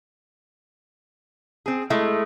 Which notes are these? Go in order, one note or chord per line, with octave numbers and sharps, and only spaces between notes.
C4 G#4
G#3 A3 E4